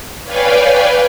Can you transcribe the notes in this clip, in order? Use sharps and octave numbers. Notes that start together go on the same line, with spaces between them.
B4 C#5 D5 F5 G5 G#5